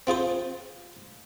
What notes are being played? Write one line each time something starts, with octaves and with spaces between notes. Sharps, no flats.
C4 F4 G#4 C5